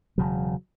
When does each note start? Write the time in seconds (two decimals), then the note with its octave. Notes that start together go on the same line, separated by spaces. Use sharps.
0.18 E1 D#2 C#3 F#3